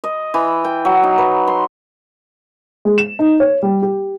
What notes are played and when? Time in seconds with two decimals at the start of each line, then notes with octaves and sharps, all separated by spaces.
0.04 D#5
0.34 E3
0.64 G5
0.85 F#3
1.03 D#4
1.18 B4
1.47 C6
2.85 G#3
2.98 E7
3.19 D#4
3.40 C#5
3.63 G3
3.82 G4